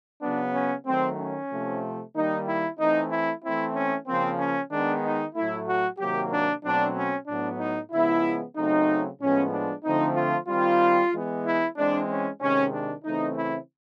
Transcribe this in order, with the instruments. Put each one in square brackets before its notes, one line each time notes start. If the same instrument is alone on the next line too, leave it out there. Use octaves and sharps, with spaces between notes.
[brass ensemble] C#3 F#3 B3 D4
C#4
D#3 F#3 A3 C4
C#4
C3 F3 A3
D#3 G3 A#3 D#4
E4
E3 A3 C4 D#4
E4
E3 A3 C4 E4
C#4
C#3 F3 A#3 C4
C#4
D#3 G#3 B3 D4
D#4
A2 F#3 A3 E4
F#4
C3 D#3 F#3 A#3 G4
D4
B2 F#3 A3 C4 D4
C#4
A2 F#3 B3 D4
D#4
C#3 F3 G#3 B3 E4
C#3 F#3 A3 C4 D#4
A2 F3 G#3 B3 C#4
D4
D3 F3 A3 C4 D#4
F4
D#3 G3 C4 F4
E3 G#3 B3
E4
E3 G#3 C4 D4
C#4
C3 D#3 G#3 C#4
D4
C#3 E3 A3 C4 D#4
E4